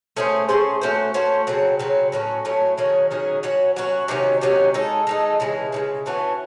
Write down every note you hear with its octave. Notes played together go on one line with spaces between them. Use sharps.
A3 C#4 G#4 C5
A3 C#4 G#4 C5
A3 C#4 F#4 C5
A3 C#4 F#4 C5
C#3 F#3 C4
C#3 F#3 C4
A2 F#3 A3 C#4
A2 F#3 A3 C#4
D#3 F#3 C#4 G#4
D#3 F#3 C#4 G#4
F#3 C#4 F#4
F#3 C#4 F#4
C3 D#3 F#3 C#4
C3 D#3 F#3 C#4
G#3 D#4 A4
G#3 D#4 A4
C#3 E3 G#3
C#3 E3 G#3
E3 A3 C#4 F#4